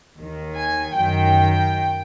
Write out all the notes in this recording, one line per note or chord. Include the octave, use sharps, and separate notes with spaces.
D#2 D#3
G#5
F#2 D#3 G5